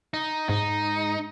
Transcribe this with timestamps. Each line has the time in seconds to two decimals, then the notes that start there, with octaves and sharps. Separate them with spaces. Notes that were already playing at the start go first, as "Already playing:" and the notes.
0.14 D#4
0.49 G#2 D#4